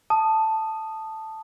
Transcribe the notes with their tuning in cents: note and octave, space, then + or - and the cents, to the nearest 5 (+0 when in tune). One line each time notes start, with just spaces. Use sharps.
A5 +0 D#6 -10